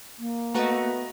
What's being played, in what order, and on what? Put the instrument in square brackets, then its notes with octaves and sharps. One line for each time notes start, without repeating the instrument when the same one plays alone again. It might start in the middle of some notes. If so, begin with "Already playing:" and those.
[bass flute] A#3
[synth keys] A3 F#4 B4 [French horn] B3 [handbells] D#5 A#5